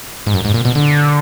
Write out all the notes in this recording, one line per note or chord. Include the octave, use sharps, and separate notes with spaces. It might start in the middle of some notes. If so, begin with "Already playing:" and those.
G#2
F#2
G#2
A#2
B2
D3